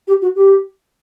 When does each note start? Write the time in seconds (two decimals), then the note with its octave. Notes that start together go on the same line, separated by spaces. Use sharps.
0.08 G4
0.22 F#4
0.36 G4